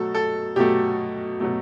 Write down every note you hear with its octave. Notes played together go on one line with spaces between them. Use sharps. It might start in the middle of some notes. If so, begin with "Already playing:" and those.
Already playing: B2 F#3 A3 A4
A4
B2 F#3 A3 G4
B2 F#3 A3